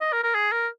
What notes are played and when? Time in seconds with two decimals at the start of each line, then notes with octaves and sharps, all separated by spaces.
0.01 D#5
0.13 A#4
0.24 A#4
0.35 G#4
0.52 A#4